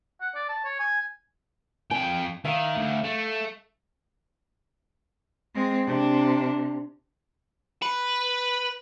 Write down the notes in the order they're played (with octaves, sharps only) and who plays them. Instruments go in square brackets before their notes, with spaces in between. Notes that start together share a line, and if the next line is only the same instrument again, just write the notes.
[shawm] F#5
D5
A5
C#5
G#5
[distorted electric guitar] F2 G5 [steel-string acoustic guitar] G#5
[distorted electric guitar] D#3 [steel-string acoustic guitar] E5 F5
[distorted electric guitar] D2
A3
[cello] G#3 C4
[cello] C3 [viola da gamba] D4
[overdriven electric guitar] B4